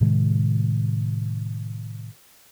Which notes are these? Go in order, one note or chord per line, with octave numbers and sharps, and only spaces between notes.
A2 C3 D#3 G#3